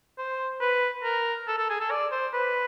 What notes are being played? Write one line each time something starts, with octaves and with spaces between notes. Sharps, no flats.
C5
B4
A#4
A4
A4
G#4
A4
D5
C5
B4